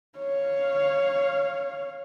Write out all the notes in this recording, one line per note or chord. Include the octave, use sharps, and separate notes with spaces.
C#5 F5